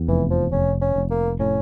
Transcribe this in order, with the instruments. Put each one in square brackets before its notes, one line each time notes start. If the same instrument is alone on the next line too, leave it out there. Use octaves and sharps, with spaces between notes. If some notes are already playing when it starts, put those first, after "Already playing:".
Already playing: [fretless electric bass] E2
[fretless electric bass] F1 [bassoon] E3
[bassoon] F3
[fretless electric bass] F1 [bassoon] C#4
[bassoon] C#4
[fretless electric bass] F1
[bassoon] A#3
[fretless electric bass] A2 [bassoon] C#4